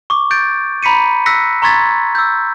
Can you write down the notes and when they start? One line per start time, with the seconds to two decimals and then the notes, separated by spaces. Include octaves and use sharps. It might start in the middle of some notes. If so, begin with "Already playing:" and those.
0.10 C#6 D6
0.31 G6 A6 D7
0.83 A#5 B5 B6 C#7 D#7
1.26 E6 F#6 A#6 B6 C#7
1.62 A#5 C6 C#6 G#6 A6 B6
2.15 E6 G6